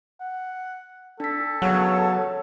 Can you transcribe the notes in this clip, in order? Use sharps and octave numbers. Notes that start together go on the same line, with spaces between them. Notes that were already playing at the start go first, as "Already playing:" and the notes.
F#5
D4 A4 B6
C#3 F#3 B3 C#5 F#5